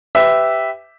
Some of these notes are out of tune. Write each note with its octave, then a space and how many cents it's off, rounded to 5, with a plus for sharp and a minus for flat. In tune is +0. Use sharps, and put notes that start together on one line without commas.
G4 +0 B4 +25 E5 -5